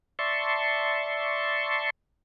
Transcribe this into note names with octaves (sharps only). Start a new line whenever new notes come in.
D5 E5 A5 C6 C#6